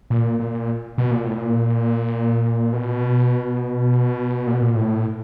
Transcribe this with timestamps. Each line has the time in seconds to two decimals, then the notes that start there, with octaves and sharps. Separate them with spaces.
0.10 A#2
0.40 A#2
0.98 B2
1.11 A#2
1.25 A2
1.38 A#2
2.73 B2
4.47 A#2
4.53 B2
4.61 A#2
4.76 A2